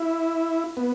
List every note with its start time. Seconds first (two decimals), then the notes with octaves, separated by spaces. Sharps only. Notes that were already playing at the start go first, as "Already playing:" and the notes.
Already playing: E4
0.77 B3